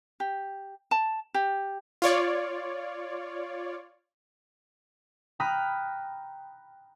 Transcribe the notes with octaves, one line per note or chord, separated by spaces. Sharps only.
G4
A5
G4
F4 C#5 D5
G5 A#5 B5 D#6 F6 F#6